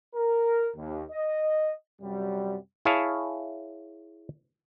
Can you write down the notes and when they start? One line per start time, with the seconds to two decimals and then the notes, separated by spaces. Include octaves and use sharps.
0.15 A#4
0.76 D#2
1.12 D#5
2.02 F#2 C3 F#3 G3
2.85 E4 G#4 C#5 F5 A5